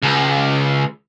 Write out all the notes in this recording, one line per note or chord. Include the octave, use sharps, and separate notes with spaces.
C#2